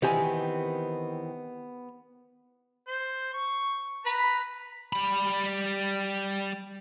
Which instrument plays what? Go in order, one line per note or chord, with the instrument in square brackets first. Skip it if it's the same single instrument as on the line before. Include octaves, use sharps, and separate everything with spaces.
[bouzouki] D#3 E3 C4 [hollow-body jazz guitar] B3 G4 G#5
[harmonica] C5
C#6
B4 A#5 B5
[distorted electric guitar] G3 B5